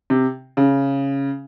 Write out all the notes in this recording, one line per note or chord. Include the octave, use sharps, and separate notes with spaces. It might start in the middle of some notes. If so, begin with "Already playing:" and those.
C3
C#3